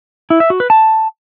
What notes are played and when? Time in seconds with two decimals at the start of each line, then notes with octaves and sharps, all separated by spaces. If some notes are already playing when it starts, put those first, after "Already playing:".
0.30 E4
0.40 E5
0.50 F#4
0.60 B4
0.70 A5